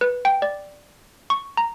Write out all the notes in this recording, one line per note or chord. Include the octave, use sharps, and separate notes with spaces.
B4
G5
D5
C#6
A#5